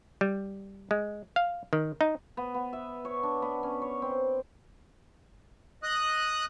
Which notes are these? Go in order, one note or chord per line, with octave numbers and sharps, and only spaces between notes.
G3
G#3
F5
D#3
D#4
B3
B3
E5
C#5
D4
B3
C#4
C#5
C4
D#5 D#6 F#6